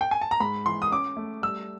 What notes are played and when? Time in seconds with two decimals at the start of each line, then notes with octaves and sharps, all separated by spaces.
0.01 G5
0.11 G#5
0.21 A5
0.31 A#5
0.40 G#2 B5
0.66 E3 C6
0.82 D#6
0.91 C#4 D6
1.17 A3
1.42 G3 E6